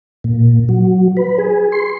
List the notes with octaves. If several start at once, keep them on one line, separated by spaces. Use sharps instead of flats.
A#2
F#3
B4
G#4
C6